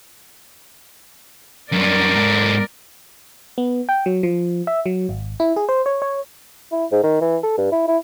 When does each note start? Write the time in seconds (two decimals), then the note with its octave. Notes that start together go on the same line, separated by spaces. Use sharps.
1.72 F#2 G3 A#4 D5
2.16 G#2 A4
3.58 B3
3.89 G5
4.06 F#3
4.23 F3
4.67 E5
4.86 F#3
5.09 G#1
5.40 E4
5.56 G#4
5.69 C5
5.86 C#5
6.02 C#5
6.72 E4
6.92 G#2
7.03 D#3
7.21 E3
7.43 A4
7.58 G2
7.72 E4
7.88 E4